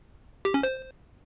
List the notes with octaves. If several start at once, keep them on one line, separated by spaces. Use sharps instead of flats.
G4
C#4
C5